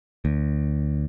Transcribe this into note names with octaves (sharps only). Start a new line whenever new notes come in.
D2